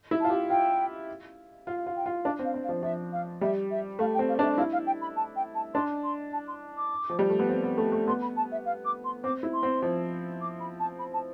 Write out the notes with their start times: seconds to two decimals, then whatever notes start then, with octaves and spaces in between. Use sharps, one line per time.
0.11 E4
0.20 A5
0.24 F4
0.30 G4
0.50 F4 G5
1.67 F4 F5
1.86 F4
1.96 G5
2.06 F4
2.25 D4 F5
2.39 C4
2.44 F5
2.54 C4
2.64 F5
2.69 F3
2.83 F3 E5
3.12 F5
3.41 G3 E5
3.71 E5
3.99 A3 F5
4.14 G5
4.19 C4
4.28 F5
4.39 D4
4.43 E5
4.58 E4 F5
4.72 F5
4.86 G5
5.01 B5
5.16 A5
5.36 G5
5.55 A5
5.74 D4 C6
6.03 C6
6.33 A5
6.47 C6
6.76 D6
7.10 F3
7.19 G3
7.30 A3
7.39 B3
7.49 C4
7.63 B3
7.77 A3
7.92 A3
8.07 B3 C6
8.21 B5
8.36 A5
8.51 E5
8.65 F5
8.85 D6
9.04 C6
9.23 C4 D6
9.43 E4
9.53 C6
9.63 C4
9.82 F3
10.41 D6
10.60 B5
10.79 A5
10.99 B5
11.13 A5